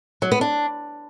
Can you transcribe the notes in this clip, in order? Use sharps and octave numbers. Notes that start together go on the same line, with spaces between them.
F#3
B3
D4